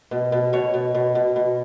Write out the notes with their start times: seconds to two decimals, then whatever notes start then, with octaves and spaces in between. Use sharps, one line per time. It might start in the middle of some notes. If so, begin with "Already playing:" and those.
0.11 B2
0.32 B2
0.53 B2 C#5
0.74 B2
0.95 B2
1.15 B2
1.36 B2